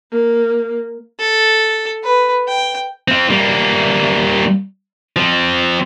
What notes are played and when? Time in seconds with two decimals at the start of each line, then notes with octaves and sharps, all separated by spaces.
0.11 A#3
1.19 A4
2.03 B4
2.48 G5
3.08 C4 F4
3.30 G3 A#3
5.16 F3 C4